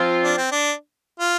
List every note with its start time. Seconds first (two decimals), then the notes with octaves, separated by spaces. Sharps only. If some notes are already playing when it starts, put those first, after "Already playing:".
Already playing: F3 C4 F4
0.24 D4
0.37 C4
0.52 D4
1.20 F4